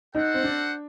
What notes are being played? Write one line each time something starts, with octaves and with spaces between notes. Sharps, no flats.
D#4 F#4 A4 C5 F#5
C4
D4